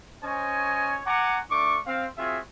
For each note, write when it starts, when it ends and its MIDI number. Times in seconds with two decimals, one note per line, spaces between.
0.24 1.01 61
0.24 1.01 72
0.24 1.01 73
0.24 1.01 75
0.24 1.01 80
1.06 1.39 78
1.06 1.39 80
1.06 1.39 82
1.06 1.39 85
1.06 1.39 86
1.51 1.78 57
1.51 1.78 62
1.51 1.78 85
1.51 1.78 86
1.87 2.06 60
1.87 2.06 77
2.18 2.40 60
2.18 2.40 65
2.18 2.40 66
2.18 2.40 68
2.18 2.40 76